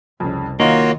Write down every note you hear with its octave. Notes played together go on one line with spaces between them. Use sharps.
C2 F2 C#3
D#3 A#3 D#4 F4 F#4 C#5